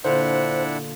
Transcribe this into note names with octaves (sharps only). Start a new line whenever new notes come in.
A#2 D3 D4 E4 C5 F#5